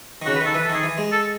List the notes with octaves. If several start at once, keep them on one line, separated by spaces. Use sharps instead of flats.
D#3
C#3 F#4
B4
D#3 A4
E3 B4
A4
D#3 G#4
E3
G#3
A4